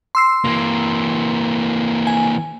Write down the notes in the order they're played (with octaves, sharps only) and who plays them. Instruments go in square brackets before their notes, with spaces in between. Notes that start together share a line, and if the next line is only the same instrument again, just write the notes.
[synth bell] C6 E6 C7
[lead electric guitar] E3 A#3
[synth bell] G#5